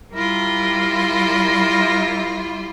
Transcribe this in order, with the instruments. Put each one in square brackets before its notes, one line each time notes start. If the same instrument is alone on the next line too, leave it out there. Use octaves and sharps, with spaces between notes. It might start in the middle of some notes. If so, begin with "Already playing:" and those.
[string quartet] G3 E4 F4 [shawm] A#4